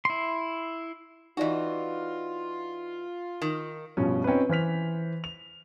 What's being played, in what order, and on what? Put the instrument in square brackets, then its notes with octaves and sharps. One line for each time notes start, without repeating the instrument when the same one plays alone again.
[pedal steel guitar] E4 C6
[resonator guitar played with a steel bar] E3 F#4 [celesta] D#4 D5 D#5 [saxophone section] F4
[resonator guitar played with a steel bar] D#3
[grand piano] G2 B2 F3 C#4
C4 C#4 D#4 F4 B4
E3 C5 F6 B6 F7
F7